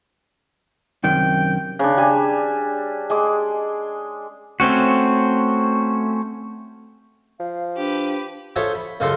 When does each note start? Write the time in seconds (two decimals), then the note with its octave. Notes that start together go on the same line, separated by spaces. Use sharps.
1.04 F#2 C3 D#3 G5
1.79 C#3 D4
1.97 G3 G#5
3.10 G#3 D6
4.60 A3 C4 C#4 F#4
7.40 F3 F5
7.76 D4 G4 B4
8.56 F4 G#4 A4 C5 C#5 E5
8.75 B5
9.00 C#2 F#2 C#3 F4 A4 C6